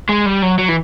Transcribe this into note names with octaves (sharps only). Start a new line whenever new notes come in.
G#3
G3
F#3
F#3
E3